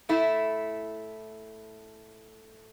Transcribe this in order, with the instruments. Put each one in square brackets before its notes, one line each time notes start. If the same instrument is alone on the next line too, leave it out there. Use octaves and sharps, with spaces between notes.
[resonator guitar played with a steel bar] A2 A3 E4